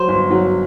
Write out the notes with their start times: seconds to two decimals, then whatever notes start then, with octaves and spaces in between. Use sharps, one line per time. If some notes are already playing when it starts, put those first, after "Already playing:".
Already playing: F#3 C5
0.08 G1
0.30 F#3